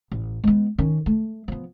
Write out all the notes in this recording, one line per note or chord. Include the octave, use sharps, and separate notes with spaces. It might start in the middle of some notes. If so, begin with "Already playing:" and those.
A1
G#3 B3
D#3 C#4
A3
F3 B3